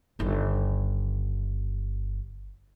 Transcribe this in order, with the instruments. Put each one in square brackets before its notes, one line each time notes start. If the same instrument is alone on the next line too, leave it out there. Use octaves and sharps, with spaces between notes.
[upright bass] G1 D#3